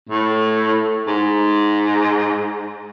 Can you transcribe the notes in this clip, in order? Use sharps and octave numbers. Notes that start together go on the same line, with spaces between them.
A2
G#2